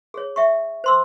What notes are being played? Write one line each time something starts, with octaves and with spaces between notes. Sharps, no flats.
G#4 C#5
E5 G5 C#6
C5 C6 E6